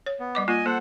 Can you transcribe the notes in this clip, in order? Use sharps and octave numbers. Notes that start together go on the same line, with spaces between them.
C#5
B3
G3 D#5 D6
A#3 F4 D#5 G#5
A#3 A4 C5 F#5